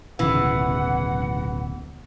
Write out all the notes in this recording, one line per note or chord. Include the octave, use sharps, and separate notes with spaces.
D1 B1 C#3 E3 F#5